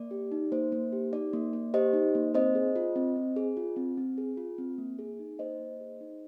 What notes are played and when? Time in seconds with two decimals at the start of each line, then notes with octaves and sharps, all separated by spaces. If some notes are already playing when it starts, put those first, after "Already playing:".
Already playing: A#3 D5
0.11 G4
0.32 D#4
0.52 A#3 C5
0.72 A#3
0.92 G4
1.12 D#4 D5
1.33 A#3
1.53 A#3
1.74 G4 C5 D#5
1.93 D#4
2.15 A#3
2.34 C4 C5 D#5
2.55 G#4
2.76 F4
2.96 C4
3.16 C4
3.36 G#4
3.57 F4
3.76 C4
3.98 C4
4.18 G#4
4.37 F4
4.58 C4
4.78 A#3
4.99 G#4
5.19 D#4
5.39 A#3 C5 D#5
5.60 A#3
5.80 G#4
6.01 D#4